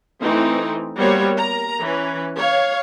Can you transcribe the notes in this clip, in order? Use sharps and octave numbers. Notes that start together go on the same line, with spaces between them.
E3 A3 C4 D#4
G3 A#3 B3 F#4 C5 C#5
A#4 A#5
E3 C#4 B4
C#5 F5